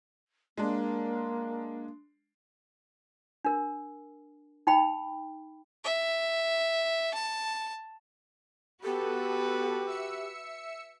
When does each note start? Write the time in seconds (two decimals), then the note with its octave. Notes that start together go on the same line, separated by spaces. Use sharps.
0.58 G#3 A#3 D4
3.45 D4 A#4
4.67 D#4 G5 B5
5.84 E5
7.14 A5
8.84 B3 F#4 G4 A4 B4
9.86 E5 E6 C#7